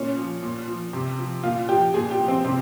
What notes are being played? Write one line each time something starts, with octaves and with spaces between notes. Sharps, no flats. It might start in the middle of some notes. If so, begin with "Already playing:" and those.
Already playing: A#2 C#4
F3
A#2
F3
C3
F3
A#2 F4
F3 G4
A#2 G#4
G4
F3
C4
C3 C4